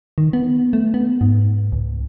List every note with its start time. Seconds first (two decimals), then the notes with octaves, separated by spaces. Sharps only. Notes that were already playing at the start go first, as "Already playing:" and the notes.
0.18 D#3
0.33 B3
0.73 A3
0.94 B3
1.21 G#2
1.72 C#2